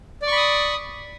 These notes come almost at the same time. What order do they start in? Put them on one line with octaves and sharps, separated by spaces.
D5 C#6 B5 D#6